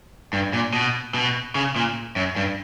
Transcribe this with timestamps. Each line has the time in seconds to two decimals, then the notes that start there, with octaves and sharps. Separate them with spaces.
0.33 G2
0.53 A#2
0.73 B2
1.14 B2
1.55 C#3
1.76 A#2
2.16 F#2
2.36 G2